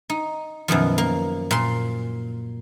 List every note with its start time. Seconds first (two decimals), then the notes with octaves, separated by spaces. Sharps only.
0.10 D#4
0.68 F#2 B2 D#3 F3
0.98 A#3
1.51 A#2 C6